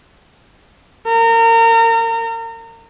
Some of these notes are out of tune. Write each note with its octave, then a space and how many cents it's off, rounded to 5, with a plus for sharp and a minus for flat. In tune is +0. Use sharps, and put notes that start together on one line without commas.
A#4 -30